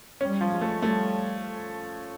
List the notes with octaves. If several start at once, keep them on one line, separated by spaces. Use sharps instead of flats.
G3 C#4
F3
G#3
A3
G3 A3